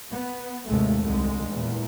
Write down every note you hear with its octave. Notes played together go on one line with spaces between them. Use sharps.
B3
A1 D#2 G#2 C3 G#3 A3
C2 D3 G3 G#3
E2 A#2